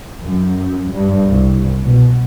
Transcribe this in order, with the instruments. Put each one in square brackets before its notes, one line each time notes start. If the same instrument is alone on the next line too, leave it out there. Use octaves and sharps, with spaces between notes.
[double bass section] F#2
G2
C2
B2